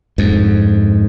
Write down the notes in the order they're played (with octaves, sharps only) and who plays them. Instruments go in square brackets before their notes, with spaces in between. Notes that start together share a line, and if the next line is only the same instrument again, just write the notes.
[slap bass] F2 G#2